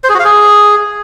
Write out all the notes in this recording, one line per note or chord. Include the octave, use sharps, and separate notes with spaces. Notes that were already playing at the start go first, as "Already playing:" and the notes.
C5
G#4
F#4
F5
G#4